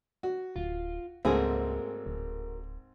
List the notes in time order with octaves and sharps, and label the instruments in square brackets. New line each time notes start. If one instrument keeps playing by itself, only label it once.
[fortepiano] F#4
[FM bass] D1 [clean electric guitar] F4
[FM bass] C#2 [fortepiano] G#2 C4 [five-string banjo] A3 A#3 G#4 [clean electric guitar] F#4 A#4
[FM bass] D1